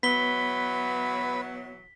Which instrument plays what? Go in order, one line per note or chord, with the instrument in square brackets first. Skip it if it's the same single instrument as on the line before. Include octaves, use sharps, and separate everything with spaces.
[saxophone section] B2 E3 F#3 [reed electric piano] B3 [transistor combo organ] B4 [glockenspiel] B6 G7